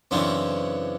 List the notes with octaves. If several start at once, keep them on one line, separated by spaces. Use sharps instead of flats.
F#2 C#3 E3 C4 D4